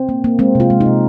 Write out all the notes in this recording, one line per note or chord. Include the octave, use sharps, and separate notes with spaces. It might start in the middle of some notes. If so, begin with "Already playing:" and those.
Already playing: C4
A#3
A#3
G#3 C4
C3 F4
G#3
D#4
C3